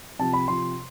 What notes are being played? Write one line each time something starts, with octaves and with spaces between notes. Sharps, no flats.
C3 F3 A5
B5
C3 F3 C6